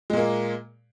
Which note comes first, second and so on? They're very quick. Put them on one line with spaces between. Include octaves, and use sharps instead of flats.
G#3 A#2 A#3